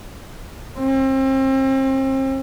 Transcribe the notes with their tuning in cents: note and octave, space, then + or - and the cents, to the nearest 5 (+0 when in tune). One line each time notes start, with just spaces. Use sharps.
C4 +35